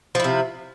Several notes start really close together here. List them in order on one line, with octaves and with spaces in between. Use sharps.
F3 E4 C3